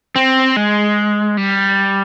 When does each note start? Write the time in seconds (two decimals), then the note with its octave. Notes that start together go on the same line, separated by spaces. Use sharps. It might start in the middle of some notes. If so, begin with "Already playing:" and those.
0.16 C4
0.56 G#3
1.37 G3